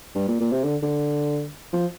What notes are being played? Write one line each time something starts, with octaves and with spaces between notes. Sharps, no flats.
G2
A#2
A#2
C3
D3
D3
F3